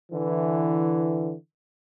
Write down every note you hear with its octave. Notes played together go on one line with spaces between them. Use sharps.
D3 E3